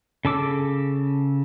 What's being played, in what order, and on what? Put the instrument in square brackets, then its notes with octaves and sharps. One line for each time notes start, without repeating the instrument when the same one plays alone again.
[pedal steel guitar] C#3 A4 D6 E6